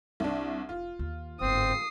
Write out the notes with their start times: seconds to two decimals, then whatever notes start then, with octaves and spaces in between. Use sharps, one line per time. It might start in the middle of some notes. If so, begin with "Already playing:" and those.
0.20 C2 D4
0.69 F1 F4
0.99 D#2
1.41 G1 G#2 C4 D#6 C7